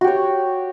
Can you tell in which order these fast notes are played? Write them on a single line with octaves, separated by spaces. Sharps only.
F#4 G4 C#5